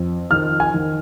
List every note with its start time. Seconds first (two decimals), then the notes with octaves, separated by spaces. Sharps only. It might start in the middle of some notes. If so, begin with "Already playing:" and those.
Already playing: F2
0.31 D#3 F6
0.60 G#5
0.74 D#3